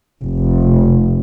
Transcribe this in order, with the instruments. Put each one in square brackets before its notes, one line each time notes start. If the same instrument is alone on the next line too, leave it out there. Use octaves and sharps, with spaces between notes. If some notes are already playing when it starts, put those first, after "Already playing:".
[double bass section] F1